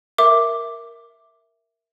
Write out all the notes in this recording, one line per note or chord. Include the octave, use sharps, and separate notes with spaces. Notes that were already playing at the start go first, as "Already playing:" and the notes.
A#4 E5 D6